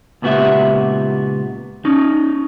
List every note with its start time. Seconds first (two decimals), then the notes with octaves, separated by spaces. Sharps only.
0.22 C#2 A#2 B3 F#4 G4 E5
1.85 C#4 D#4